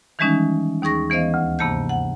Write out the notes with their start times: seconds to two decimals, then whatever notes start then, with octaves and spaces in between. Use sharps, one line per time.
0.19 D#3 E3 G3 G#3 C#4 D#4
0.82 D#2 D#4 G#4 C#6 A#6
1.10 E3 B3 C5 D#5 F5
1.34 D2
1.59 G2 C3 A#3 A5 G6
1.89 F#5